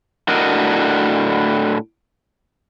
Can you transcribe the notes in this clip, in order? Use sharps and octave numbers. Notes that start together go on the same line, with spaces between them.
A2 D4 F#4 A#4 D#5